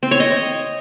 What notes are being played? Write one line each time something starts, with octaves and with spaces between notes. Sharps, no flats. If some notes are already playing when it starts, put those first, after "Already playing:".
C4
C#5
D#5